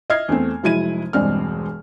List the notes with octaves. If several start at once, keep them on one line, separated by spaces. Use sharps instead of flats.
D#5 E5 F6 G#6 C7
E2 A3 C4
F1 F#3 G#3 E4 G#6 D#7
E1 G2 G#3 C4 D5 F6